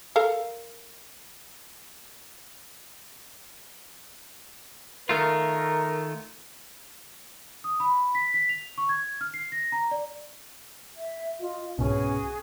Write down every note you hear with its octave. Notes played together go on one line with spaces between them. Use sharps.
A4 A#4 F5
D#3 A3 F4 A#4
D#6
B5
B6
B6
F7
C#6
G#6
F6
C7
A#6
A#5
D5
E5
F4 D#5
C2 G#2 B2 B3 C#4 F#4 G#4 G#5